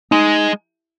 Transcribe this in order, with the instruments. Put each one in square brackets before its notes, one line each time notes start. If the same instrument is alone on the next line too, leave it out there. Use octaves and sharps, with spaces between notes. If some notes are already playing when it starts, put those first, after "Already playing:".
[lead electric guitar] G#3 [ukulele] D#4